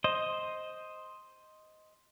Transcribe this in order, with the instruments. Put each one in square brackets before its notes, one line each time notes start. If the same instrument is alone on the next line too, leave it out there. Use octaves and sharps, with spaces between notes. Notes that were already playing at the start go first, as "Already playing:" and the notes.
[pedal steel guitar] C5 D#5